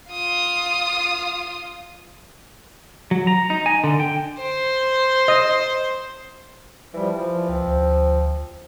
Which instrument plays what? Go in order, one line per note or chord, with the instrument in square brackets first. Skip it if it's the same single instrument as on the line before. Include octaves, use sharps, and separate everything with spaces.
[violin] F4 D#6
[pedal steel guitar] F#3
A#5
D#4
G#5
D3
G5
[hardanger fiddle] C5
[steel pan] D#5
[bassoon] E3 [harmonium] F3 G3
[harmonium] F3
[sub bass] C#2 [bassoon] C4
[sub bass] D2